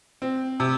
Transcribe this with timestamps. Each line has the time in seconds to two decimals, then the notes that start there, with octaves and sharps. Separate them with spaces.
0.22 C4
0.60 C3